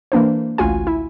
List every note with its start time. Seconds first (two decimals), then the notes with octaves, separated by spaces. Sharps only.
0.12 E3 A#3 D4 C5
0.58 A1 D2 F4 F#4 G#5
0.87 E4